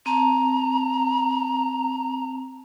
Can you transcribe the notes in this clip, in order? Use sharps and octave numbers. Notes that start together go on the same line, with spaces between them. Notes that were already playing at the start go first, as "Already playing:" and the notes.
C4 A5 A#5